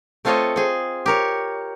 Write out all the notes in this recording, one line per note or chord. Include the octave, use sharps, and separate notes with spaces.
A3 C4 F4 A4 C#5 D#5
C4 G#4
G4 A#4 C#5